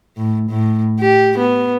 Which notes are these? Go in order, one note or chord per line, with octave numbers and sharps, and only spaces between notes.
A2
A2
G4
B3